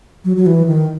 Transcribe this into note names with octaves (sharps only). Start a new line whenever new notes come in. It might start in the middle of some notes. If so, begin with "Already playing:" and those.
F#3
F#3
E3
D#3